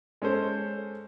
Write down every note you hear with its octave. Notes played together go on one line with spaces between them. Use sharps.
G#3 C#4 A4 C5